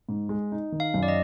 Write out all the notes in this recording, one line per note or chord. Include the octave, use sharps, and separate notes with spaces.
G#2
G#3
D#4
D#3
F5
F#2
D5
D#5